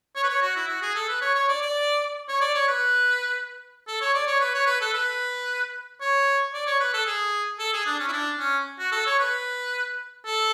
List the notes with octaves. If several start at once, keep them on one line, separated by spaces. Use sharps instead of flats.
C#5
B4
C#5
F#4
E4
F#4
G#4
A4
B4
C#5
C#5
D5
D5
C#5
D5
C#5
B4
A4
C#5
D5
C#5
B4
C#5
B4
A4
B4
C#5
D5
C#5
B4
A4
G#4
A4
G#4
D4
C#4
E4
D4
C#4
F#4
A4
C#5
B4
A4